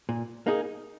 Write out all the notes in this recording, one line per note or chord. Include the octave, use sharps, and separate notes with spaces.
A#2
A#3 D#4 G#4